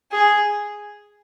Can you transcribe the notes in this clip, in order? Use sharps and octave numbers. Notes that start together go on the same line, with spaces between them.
G#4